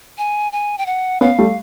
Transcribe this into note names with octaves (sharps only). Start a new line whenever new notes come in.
G#5
G#5
G5
F#5
B3 C#4 F5
G3 A3